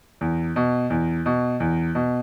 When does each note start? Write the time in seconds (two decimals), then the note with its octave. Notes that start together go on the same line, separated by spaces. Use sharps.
0.21 E2
0.56 B2
0.90 E2
1.26 B2
1.60 E2
1.95 B2